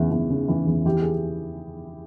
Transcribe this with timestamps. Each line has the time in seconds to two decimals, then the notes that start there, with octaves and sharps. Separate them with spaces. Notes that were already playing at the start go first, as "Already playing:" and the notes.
Already playing: E2 C#3 E3
0.11 E2
0.30 C#3
0.48 E3
0.67 E2
0.85 E3 G4
1.02 G#4